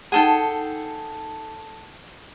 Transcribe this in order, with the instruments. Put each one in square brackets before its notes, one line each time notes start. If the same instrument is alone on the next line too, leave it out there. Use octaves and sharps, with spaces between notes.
[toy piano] D#4 F#5 [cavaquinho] G#4 A4 G5